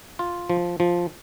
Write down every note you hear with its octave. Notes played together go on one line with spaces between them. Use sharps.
F4
F3
F3